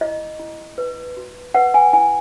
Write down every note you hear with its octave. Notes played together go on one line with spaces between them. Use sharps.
E4 D#5
E4
B4
F#4
B4 F#5
G#5
E4 G#5